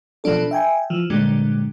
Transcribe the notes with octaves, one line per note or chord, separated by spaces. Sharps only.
B2 F3 F#3 D4 A4
E5 G5 G#5
E3 F3
G2 A#2 D3 F#3 G#3 D4